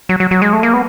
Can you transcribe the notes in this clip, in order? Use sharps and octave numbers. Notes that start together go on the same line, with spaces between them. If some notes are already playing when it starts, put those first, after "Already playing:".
F#3
F#3
F#3
G#3
A3
A#3
B3